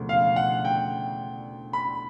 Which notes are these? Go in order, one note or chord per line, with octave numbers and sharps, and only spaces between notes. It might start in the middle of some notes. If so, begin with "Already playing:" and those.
Already playing: E1 D2 C#3 F3
F5
F#5
G5
B5